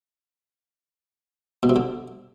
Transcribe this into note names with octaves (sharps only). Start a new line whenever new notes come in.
B2
C3
D3